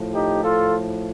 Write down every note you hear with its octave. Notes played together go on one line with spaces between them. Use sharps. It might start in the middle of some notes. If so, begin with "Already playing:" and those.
Already playing: A2 F3
D#4 G4
F4 A4